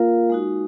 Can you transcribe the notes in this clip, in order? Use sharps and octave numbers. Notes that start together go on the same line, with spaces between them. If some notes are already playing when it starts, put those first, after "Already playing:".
Already playing: A#3 F4 A#4 F5
G#3 D#4 F#4